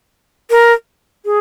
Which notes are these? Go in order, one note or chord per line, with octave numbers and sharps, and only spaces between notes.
A#4
G#4